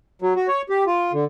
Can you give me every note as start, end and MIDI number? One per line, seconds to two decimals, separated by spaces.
0.22 0.33 54
0.36 0.47 66
0.48 0.62 73
0.69 0.84 67
0.87 1.12 65
1.13 1.24 50